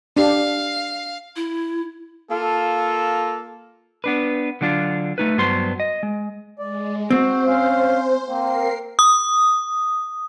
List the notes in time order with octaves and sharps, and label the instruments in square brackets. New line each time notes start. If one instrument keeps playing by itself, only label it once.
[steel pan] D4 G4 [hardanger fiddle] F5
[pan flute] E4
[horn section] A#3 F4 A4
[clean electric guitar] B3 D4 B4
D3 F#3 D4 F4
A3 D#4 B4
G2 F#3 B3 C5 C6
D#5
G#3
[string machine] G#3 [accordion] D5
[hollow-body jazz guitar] C4 [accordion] F#4 [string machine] C5
[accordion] C#4 F5
[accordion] A#3 C4 [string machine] A#4 C7
[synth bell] D#6